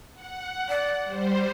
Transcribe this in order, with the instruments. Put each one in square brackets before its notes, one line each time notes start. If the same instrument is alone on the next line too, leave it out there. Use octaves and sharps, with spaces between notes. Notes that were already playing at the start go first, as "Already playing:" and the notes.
[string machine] F#5
[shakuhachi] D5
[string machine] G3 C5